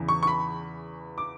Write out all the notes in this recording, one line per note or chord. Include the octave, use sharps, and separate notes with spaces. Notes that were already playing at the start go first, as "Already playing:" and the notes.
Already playing: E2 C#3 E3
C#6
C#6
B5
D6